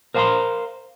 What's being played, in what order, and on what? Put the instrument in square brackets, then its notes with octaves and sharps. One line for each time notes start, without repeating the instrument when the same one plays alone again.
[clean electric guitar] A#4 C5 F5 G#5 A#5 C6